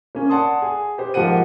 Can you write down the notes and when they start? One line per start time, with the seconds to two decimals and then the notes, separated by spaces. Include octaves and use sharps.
0.15 A#3 C#4
0.29 D5 F#5 A5 C6 D#6
0.62 G#4
0.98 G4 B4 C5
1.14 G#2 F3 A#3 G4 F#5 D#7